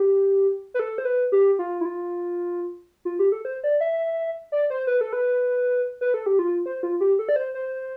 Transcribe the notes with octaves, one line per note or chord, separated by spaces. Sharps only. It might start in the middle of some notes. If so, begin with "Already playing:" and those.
Already playing: G4
B4
A4
C5
B4
G4
F4
E4
F4
F4
G4
A4
C5
D5
E5
D5
C5
B4
A4
B4
B4
A4
G4
F4
C5
F4
G4
A4
D5
C5
C5